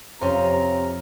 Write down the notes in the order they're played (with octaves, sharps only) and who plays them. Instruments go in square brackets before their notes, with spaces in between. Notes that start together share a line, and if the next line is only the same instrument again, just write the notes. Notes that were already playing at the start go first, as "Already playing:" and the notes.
[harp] F2 [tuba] C3 [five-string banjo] C#4 C5 [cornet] A#5